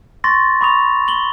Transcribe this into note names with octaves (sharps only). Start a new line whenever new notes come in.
C6 C#6 A6 A#6
B5 C#6 D#6 F7
F#7 G7